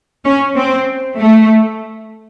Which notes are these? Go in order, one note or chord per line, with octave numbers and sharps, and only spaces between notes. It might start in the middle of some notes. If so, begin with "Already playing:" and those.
C#4
C4
A3